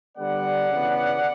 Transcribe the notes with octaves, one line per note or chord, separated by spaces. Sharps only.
D3 G3 B3 D5 F#5
C#3 E3 B3